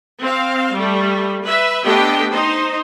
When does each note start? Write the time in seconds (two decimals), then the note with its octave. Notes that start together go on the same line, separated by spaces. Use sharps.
0.21 C4 F5
0.73 G3 A3
1.42 B4 E5
1.84 A3 B3 D4 G4 D#5 G5
2.29 D#4 C5